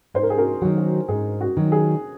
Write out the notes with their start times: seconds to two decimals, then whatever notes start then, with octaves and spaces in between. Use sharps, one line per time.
0.14 G#2 C5
0.23 A#4
0.30 G#4
0.38 F#4 A#4
0.62 D#3 F#3 F#4
0.77 F#4
1.08 G#2 G#4
1.41 F#4
1.57 D#3 F#3
1.72 G#4